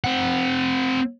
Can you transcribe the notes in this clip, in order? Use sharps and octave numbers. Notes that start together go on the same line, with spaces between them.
C4 F#5